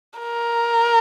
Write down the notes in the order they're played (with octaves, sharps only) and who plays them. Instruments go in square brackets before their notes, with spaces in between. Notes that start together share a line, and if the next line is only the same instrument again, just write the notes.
[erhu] A#4